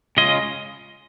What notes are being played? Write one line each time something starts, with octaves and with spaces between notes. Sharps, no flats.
C#3 G#3 C#4 F4 D#5